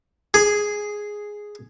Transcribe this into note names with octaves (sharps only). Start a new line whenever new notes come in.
G#4